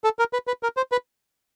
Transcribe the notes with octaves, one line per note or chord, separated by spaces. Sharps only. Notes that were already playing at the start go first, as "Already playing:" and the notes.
A4
A#4
B4
B4
A#4
C5
B4